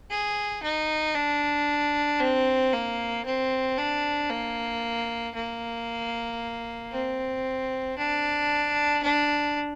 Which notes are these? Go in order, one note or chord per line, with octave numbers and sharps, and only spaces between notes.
G#4
D#4
D4
C4
A#3
C4
D4
A#3
A#3
C4
D4
D4